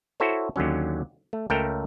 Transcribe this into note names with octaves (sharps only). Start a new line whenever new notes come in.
E4 F#4 A4 C5 C#5
D#2 D3 F#3 C#4
A3
C#2 A3 A4 A#4 G5